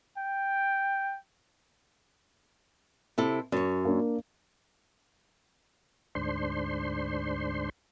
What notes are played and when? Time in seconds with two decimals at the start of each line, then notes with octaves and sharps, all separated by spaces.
0.18 G5
3.18 C3 E4 A4
3.52 F#2 C#5
3.85 A#3 D4
6.15 D2 G#2 D4 C5 C6